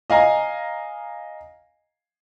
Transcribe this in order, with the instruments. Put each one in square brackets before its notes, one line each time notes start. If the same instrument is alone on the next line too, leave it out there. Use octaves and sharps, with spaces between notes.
[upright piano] D#5 F5 G#5 A#5